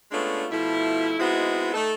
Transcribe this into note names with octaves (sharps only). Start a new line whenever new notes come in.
G#3 A3 B3 C#4 D4 F4
B2 F3 A3 E4
G#3 B3 C4 D#4 E4 F#4
A3 D#4 A4